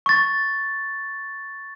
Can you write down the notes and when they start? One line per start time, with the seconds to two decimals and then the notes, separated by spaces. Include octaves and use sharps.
0.06 C#6 A6